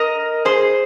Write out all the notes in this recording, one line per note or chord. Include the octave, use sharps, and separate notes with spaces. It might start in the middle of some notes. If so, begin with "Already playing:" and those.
Already playing: A#4 D#5
G#4 C5